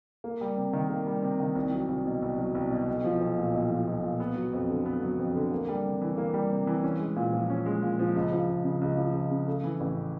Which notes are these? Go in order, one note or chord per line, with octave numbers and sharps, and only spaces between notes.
A#3
G3
C3
D#3
A#3
G3
C3
D#3
C2
F#3
C2
B2
C2
F#3
C2
B2
B1
F3
B1
A#2
B1
F3
B1
A#2
B3
F#3
F2
D3
B3
F#3
F2
D3
A#3
G3
C3
E3
A#3
G3
C3
E3
C#4
G#3
A#2
F3
C#4
G#3
A#2
F3
C#2
F3
C#2
C#3
C#2
F3
C#2
C#3
A3
E3
A1